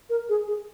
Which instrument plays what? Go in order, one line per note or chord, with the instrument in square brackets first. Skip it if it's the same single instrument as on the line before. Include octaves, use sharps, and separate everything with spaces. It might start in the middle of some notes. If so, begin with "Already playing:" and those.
[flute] A#4
G#4
G#4